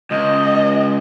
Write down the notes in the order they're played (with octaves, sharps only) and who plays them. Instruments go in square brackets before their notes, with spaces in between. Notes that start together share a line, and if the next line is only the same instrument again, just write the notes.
[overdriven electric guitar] C#2 [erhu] D#5